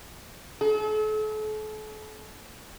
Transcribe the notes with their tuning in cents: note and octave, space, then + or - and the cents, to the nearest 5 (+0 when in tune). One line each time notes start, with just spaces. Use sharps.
A4 -40